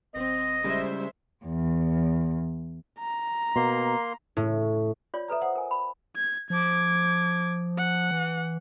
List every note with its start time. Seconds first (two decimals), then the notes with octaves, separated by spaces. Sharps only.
0.15 D#1 C4 D#5
0.64 C#3 G3 G#3 C5 E5
1.45 E2
2.99 A#5
3.56 B2 A#3 C6
4.37 A2
5.14 F4 C#5 D5
5.28 A4 B4 D5 E5 A#5
5.41 C5 F#5 D#6
5.56 A#4 G#5
5.71 B5
6.16 G#6
6.50 F3 D6 G#6
7.78 F#5
8.11 E3